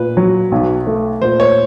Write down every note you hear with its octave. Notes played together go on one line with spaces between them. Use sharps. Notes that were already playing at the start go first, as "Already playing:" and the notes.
Already playing: A#2 B4
F#3
B1
A3
A#2 C5
C#5